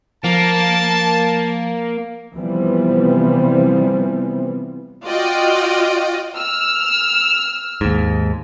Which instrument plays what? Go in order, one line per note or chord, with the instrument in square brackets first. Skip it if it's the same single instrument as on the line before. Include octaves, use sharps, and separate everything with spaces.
[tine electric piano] F3 [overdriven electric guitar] A#3 [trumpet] A5
[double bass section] C3 E3 F3 G3 B3 C4
[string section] F4 F#4 D5 D#5 G5
E6 F6
[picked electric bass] D#2 G#2